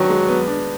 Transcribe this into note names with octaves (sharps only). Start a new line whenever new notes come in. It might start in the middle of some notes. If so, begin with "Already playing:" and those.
Already playing: D#3 F#3 B3 D4
G#3
B3
D4